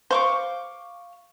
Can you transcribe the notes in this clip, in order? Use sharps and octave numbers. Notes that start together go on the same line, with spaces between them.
C5 F5 C#6 D6